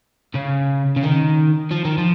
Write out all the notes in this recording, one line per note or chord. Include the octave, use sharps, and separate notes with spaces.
C#3
C#3
D#3
F3
D#3
F3